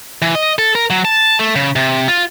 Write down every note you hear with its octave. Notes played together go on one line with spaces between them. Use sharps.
E3
D#5
A4
A#4
F#3
A5
A3
C#3
C3
F4